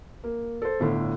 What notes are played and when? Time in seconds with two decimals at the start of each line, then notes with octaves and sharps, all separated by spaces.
0.24 A#3
0.62 A4 C5
0.80 G1 A2 D3